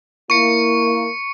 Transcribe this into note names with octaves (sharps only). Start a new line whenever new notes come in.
A#3 E4 C#6 C#7